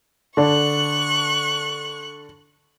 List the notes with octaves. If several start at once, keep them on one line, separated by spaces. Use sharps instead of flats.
D3 D4 C#6 F#6